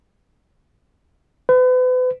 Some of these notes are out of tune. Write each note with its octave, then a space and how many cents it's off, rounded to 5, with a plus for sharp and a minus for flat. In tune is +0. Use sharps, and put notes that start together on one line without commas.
B4 +40